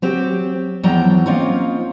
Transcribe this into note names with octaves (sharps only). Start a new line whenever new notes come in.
F#3 C4 G4
E2 F3 F#3 G5 A#5
A#3 C4 C#4 D#4 F4